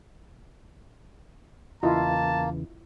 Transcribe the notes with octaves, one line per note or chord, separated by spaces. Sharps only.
E2 C#3 E3 A#3 E4 F4 D#5 A5